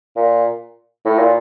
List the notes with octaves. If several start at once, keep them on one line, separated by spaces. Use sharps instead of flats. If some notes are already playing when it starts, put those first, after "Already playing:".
A#2
A2
A#2